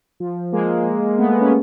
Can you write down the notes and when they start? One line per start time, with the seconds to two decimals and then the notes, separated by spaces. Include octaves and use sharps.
0.20 F3
0.52 G#3 A#3
1.18 A3 B3
1.30 G#3 A#3
1.41 B3 C#4